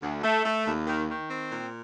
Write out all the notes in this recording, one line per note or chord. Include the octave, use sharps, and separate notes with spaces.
D2
A3
A3
D#2
D#3
D#3
C4
A#2